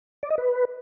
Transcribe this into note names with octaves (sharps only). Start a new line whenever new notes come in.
D5
D#5
B4